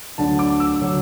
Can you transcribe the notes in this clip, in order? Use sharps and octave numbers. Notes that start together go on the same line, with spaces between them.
D2 D3 F#3 D4 A5
D6
E6
D3 F#3